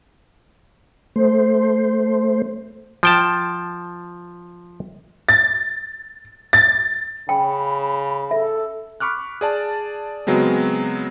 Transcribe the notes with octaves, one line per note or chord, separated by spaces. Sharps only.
A3 C5
F3 G5 A5
A6
A6
C#3 G5 B5
A4 E5
B5 C#6 D6 F6 F#6
G#4 D5 A5
C#3 F#3 G#3 B3 C4